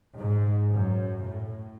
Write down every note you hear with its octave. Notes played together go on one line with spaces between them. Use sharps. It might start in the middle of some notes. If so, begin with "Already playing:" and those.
G#2
F#2
A2